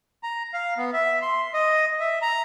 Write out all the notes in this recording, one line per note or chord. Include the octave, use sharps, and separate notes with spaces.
A#5
F5
B3
E5
C6
D#5
E5
A#5